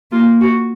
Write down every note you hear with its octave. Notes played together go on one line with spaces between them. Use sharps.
A#3 F4
F#4